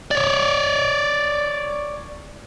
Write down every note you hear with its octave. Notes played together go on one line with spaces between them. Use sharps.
C#5 D5